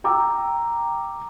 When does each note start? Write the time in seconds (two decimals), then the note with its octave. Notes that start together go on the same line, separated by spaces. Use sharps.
0.04 G5 A#5 D6 E6